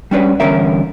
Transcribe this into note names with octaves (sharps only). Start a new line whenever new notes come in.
G3 C#4 D4 B4
E2 G2 D3 C#4 A#4 E5